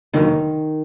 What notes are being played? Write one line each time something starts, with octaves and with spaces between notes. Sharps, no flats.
F1 D#2 D3 D#3 F#3 A#3